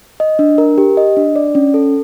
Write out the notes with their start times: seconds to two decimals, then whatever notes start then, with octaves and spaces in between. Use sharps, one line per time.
0.20 D#5
0.39 D4
0.58 A#4
0.78 G4
0.97 D#5
1.17 D4
1.36 D5
1.55 C#4
1.74 A4